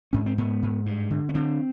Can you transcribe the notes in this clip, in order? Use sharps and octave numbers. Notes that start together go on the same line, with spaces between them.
G#2 C#4
C4
G#2 B3
G#2
G2
D3
C#4
D3 C4